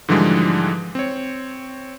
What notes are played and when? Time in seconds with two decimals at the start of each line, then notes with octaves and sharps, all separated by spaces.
0.08 G#2 D3 E3 F3 G3 G#3
0.95 C4 C#5